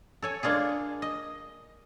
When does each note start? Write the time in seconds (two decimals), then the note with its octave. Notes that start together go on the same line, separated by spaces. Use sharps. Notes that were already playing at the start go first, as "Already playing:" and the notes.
0.22 A4 C#5 G#5
0.43 G#3 A#3 D4 F4 G#4
1.02 D#5